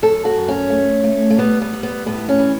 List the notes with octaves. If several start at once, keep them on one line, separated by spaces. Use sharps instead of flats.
F#2 A4
F#4
F#2
C#4
A3
A3
A3
G3 B3
B3
G3
B3
A2 B3
C#4
E3